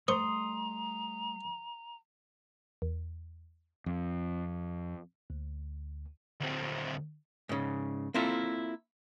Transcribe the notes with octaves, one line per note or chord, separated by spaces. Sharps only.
G3 A3 C5 A#5 C6 C#6 D#6
E2
F2
D2
D2 C4
G#2 C#3
A#3 C4 E4 F4 A4